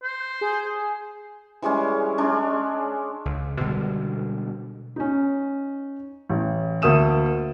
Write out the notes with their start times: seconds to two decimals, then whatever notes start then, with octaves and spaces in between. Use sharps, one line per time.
0.03 C5
0.41 G#4
1.62 E3 G3 G#3 C#4
2.18 G#3 C#4 D4
3.25 C#2
3.61 B2 D3 G3 G#3
4.96 C#4 D#4
6.29 A1
6.82 D2 A#3 E5 D#6 E7